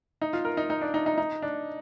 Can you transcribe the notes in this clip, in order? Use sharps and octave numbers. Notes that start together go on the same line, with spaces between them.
D#4
F4
A#4
D#4
D#4
D4
D#4
D#4
D#4
D4